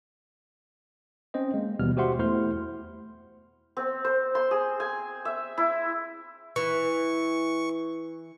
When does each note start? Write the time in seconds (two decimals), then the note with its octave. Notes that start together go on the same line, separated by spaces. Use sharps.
1.34 C4 C#4 C5 D#5
1.54 G#3 A#3
1.79 D#2 B2 E3 G3 B3 F6
1.97 F#4 G4 C5 E5 F#5 C6
2.18 E2 A3 E4 C5 C6 F6
3.77 C4
4.04 C5
4.35 C6
4.51 G#4
4.80 G#5
5.25 E5
5.58 E4
6.56 E3 C#6